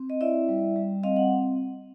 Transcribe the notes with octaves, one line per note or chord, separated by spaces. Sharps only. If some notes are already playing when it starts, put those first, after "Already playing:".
Already playing: C4
D#5
E4 D5 E5
G3
G3
C4 D#5 F5
F#5